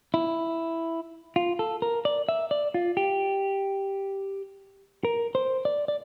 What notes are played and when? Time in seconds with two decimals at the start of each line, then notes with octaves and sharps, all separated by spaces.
0.14 E4
1.36 F4
1.59 A4
1.82 A#4
2.05 D5
2.29 E5
2.51 D5
2.74 F4
2.97 G4
5.05 A#4
5.35 C5
5.65 D5
5.88 D5